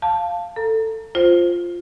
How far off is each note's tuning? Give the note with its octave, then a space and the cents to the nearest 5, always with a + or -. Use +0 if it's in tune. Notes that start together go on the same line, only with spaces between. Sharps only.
F5 +0 A5 +0
A4 +15 A#5 +0
F4 +0 C5 +0